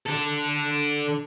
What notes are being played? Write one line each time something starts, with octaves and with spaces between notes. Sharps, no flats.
D3 A4